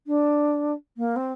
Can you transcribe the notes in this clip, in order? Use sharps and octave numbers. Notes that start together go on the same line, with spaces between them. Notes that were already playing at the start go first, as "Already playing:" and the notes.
D4
A#3
C4